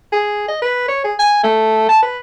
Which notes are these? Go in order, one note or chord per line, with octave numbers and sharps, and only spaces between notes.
G#4
D#5
B4
C#5
G#4
G#5
A3
A5
B4